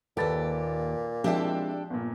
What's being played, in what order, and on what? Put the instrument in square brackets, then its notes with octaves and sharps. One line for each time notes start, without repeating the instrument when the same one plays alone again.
[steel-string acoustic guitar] D#2 G4 [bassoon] A#2 [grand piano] A4 B4 A6
[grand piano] F3 [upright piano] G#3 C4 E4 [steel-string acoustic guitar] D4 G4 A4
[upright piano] G1 A#2